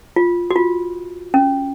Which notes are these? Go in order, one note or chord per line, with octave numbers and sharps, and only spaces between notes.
F4
F#4
F4
C#4